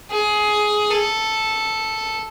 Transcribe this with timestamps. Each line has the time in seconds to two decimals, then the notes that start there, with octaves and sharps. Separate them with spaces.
0.11 G#4
0.90 A4